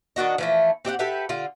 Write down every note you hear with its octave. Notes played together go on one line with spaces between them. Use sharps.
D#3 D4 F#4 D#5
E3 F3 A3
C4 G4 D#5 F#5
G4 A4 B4 E5
D3 F4